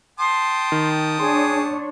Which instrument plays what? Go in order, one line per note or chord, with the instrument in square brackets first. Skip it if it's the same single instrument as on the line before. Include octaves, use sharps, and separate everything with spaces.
[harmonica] G5 A5 D#6 [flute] C6
[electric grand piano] D#3
[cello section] D4 C#5 [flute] G#4 [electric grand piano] C6